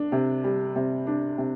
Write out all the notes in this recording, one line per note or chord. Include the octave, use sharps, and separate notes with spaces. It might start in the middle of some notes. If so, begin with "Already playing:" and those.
Already playing: D4
C3
G3
C3
D4
C3